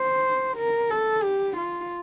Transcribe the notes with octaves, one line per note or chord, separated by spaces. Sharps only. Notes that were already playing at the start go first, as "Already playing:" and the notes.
Already playing: C5
A#4
A4
G4
F4